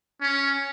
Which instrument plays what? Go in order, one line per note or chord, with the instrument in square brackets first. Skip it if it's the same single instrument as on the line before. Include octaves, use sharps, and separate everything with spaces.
[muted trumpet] C#4